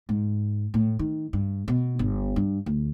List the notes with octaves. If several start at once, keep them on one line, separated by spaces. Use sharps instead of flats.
G#2
A2
D#3
G2
B2
G1
G2
D2